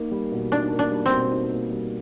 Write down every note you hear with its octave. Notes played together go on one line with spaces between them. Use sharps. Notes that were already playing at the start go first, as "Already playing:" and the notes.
Already playing: A#3 D#4
G3
B2
D4 D#4
A#3
D4
G3
C4
B2
D#4
A#3
G3